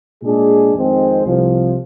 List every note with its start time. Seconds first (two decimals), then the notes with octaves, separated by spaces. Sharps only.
0.23 A#2 G#3 D4 G#4
0.74 F2 D#3 G#3 C4
1.25 C2 C3 F3